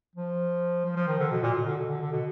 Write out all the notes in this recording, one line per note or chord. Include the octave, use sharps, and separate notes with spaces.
F3
F3
F3
D#3
D3
B2
A#2
B2
D3
B2
D3
D3
B2